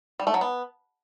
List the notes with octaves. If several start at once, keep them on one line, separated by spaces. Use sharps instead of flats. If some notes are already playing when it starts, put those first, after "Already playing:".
G3
A3
F#3
B3